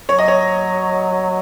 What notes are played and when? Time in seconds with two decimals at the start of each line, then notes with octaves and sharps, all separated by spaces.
0.09 F#3 C#5
0.18 D#5
0.28 C#5